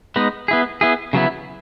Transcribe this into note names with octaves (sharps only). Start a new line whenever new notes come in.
G#3 B3 D#4
B3 E4 G#4
B3 E4 G#4
C#3 F#3 B3 E4